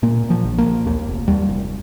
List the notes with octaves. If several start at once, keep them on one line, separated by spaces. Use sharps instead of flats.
A#2 A#3
A#2
F3
A#1
A#3
A#1
D#2 A#3
F1
D#2 G3
F1